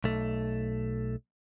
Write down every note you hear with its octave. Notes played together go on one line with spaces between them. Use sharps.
B1 A3